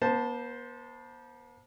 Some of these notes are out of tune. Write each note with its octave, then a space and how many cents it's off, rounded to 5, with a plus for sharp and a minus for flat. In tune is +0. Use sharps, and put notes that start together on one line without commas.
B3 -45 C5 +0 A5 +0